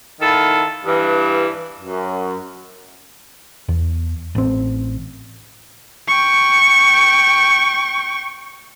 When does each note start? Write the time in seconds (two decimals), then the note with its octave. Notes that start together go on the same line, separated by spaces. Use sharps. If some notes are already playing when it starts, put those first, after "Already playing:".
0.21 D#3 E4 F4 A4
0.85 G2 E3
1.79 F#2
3.69 E2
4.35 A1 C4
6.07 G5 C#6